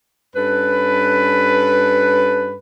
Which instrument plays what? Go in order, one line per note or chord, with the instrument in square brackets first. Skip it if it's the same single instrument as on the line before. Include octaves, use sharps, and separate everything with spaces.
[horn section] G2 C#4 A4 B4